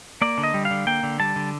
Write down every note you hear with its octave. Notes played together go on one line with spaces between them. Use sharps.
A#3 D5
D3
D#5
G3
F5
D3
A#3 G5
D3
G3 A5
D3